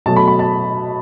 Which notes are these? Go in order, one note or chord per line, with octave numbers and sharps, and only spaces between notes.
B2 F#3 A3 A5
B5
B5
A5